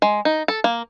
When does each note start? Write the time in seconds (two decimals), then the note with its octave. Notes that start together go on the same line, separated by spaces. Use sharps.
0.02 G#3
0.25 D#4
0.48 A4
0.64 A#3